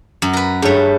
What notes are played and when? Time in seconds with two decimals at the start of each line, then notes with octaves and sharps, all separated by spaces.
0.22 F#2
0.33 A#4 B4
0.62 G2 A3 G#4 C#5